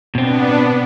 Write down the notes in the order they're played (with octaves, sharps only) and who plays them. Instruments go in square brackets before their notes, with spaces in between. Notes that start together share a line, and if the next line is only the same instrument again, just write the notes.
[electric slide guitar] B2 C4 [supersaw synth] B3 D4